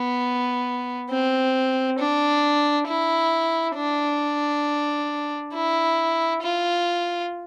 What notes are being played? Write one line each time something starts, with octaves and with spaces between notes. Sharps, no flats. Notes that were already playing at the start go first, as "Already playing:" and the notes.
Already playing: B3
C4
D4
E4
D4
E4
F4